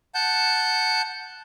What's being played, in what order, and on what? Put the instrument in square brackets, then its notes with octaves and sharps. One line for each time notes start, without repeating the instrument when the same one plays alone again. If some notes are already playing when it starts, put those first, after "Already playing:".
[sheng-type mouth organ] F#5 A5 G6